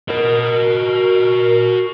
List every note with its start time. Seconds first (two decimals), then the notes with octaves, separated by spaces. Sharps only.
0.10 F#4 A#4 D#5